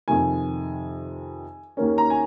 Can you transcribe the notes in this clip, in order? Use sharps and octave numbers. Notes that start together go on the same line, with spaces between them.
F2 C3 D#3 G#5
D#2 D#3 A#3 C#4
A#5
G#5